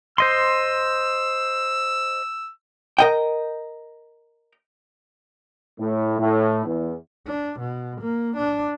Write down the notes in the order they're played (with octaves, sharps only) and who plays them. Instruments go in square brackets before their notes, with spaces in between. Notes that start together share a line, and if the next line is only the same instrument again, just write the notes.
[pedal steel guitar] C5 D#5 C6 [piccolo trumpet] E6
[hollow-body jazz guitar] A#4 D#5 G5
[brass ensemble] A2
A2
E2
[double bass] D4
B2
A#3
D4